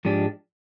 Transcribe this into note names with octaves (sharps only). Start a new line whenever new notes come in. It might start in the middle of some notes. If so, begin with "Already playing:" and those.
G#2 F3 G#3 D4 G4